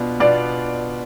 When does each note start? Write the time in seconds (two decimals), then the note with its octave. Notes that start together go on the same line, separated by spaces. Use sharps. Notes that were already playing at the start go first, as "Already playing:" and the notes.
Already playing: B2 B3 D4 F4
0.20 B2 B3 D4 F4 D5